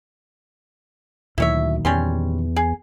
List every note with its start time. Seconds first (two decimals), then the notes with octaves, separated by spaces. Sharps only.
1.38 D2 A#2 D#3 F#3 E4 C#5 E5
1.85 E2 G3 C#4 C6
2.56 G#4